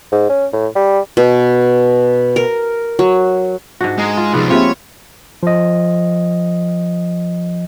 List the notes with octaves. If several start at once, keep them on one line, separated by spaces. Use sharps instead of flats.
G#2
C#4
A2
G3
B2
A#4
F#3
G#2 D4 F#4
G#3 G#4 A#4
F4
C2 F3 B3 D#4 G#4 D5
A#3 C4 F4 G4 G#4 B4 C#5 E5
F3 D#5